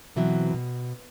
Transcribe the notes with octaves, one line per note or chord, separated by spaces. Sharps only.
B2 E3 F#3 C4 E5
B2